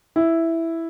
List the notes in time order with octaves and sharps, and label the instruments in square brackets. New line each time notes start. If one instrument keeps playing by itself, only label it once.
[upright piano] E4